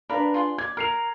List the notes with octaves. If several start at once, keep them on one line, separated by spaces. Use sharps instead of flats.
D4 A#4 B4 F5 B5
F4 G#4 C6
D5 G#6
A#4 F6 C7 F7